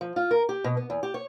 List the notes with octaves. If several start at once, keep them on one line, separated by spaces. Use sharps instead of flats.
F3
F4
A#4
G4
B2
B3
E2
G4
C#5